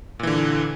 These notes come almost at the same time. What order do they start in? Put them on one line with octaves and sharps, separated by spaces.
A#2 E3 D3